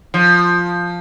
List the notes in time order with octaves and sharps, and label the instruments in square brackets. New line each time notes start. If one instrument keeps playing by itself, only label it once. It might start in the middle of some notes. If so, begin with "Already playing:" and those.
[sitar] F3